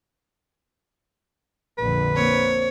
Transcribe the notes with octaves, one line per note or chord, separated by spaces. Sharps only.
A#1 F2 D3 B4
A#3 C4 C#5